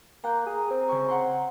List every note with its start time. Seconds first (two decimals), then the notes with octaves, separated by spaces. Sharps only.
0.24 A#3 G5 A#5 F#6 G6
0.46 G#4
0.71 C4
0.89 C#3 G5 C#6
1.08 F#5 G5 C6